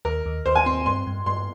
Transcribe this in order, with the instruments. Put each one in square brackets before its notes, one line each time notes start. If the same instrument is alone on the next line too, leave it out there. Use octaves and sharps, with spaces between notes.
[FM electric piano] D#2 [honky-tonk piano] A#4
[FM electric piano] D#2
[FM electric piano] D#2 [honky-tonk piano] C5
[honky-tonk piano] G#5
[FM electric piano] C4 [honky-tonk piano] C6
[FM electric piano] G2 [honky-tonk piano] C6
[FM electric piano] G2
[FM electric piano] G2 [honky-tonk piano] C6